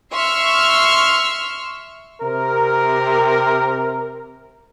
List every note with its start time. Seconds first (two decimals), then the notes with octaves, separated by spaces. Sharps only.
0.12 E5 C6 C#6 E6 F6
2.22 C3 A#4